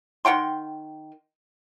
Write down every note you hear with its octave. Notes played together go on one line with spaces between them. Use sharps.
D#3 F#5 G5 C6